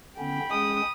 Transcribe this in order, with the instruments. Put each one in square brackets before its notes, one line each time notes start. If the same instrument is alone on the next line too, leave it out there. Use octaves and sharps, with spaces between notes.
[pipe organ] D3 B3 C#4 [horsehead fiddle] G5 B5
[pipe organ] G#3 C#4 G#4 [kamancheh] D#6